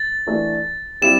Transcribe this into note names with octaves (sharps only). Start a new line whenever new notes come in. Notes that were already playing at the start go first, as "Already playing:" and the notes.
Already playing: A6
E3 A3 D4
G3 C4 E4 G4 E7